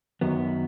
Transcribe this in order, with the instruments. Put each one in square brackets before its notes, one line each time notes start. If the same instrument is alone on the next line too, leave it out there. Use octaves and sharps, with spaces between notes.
[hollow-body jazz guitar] F#2 D#3 F#3 B3